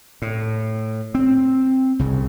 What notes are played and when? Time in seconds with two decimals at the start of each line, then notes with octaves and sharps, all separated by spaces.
0.22 A2
1.15 C4
1.99 C2 C#3